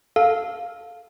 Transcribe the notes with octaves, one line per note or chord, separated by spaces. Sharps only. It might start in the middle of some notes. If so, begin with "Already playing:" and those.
A4 F5